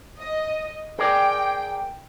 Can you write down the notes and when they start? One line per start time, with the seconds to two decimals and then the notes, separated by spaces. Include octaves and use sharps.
0.18 D#5
0.99 G#4 A#4 D5 G5